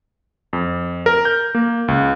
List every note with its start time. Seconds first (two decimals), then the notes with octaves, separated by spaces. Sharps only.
0.53 F2
1.06 A#4
1.25 G6
1.55 A#3
1.88 C#2